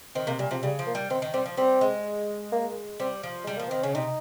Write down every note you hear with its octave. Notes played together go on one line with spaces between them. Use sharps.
D#3 C4
C3 A#3
A#2 G3
C3 F3
C#3 G3
F3
A#3
G3
D#3 C4
D#3
G3 C4
F3
G3 C4
G#3
A#3
G3 C4
F3
G3 G#3
F3 A#3
D#3 C4
C#3 C#4
C3 D#4